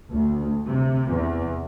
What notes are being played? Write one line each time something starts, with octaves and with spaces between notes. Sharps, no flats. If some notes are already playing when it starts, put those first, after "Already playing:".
D2
C3
E2